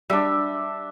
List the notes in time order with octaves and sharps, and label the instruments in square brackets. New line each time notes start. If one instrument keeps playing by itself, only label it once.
[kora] G3 [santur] D4 E5